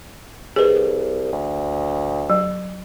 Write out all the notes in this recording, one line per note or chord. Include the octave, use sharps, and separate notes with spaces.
C2 G#4 B4
D2
F#3